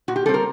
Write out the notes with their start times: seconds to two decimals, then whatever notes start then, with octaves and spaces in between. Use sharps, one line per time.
0.08 A#2 F#4
0.16 G4
0.26 G3 C4 A4
0.34 A#4